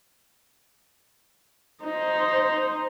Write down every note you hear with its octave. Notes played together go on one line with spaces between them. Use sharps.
D#4 C5